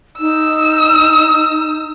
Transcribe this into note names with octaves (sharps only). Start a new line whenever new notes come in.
D#4 E6